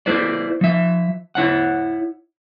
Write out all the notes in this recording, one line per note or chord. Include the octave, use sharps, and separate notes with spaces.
E4 B4 C5 D5
F3 E5
E4 C#5 F#5